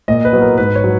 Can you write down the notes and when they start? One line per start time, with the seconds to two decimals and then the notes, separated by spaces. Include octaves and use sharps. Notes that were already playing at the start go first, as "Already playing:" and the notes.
0.08 A#2 D#5
0.25 B4
0.33 F#3 B3
0.42 A#4
0.58 G#2 B4
0.75 C#5
0.84 F#3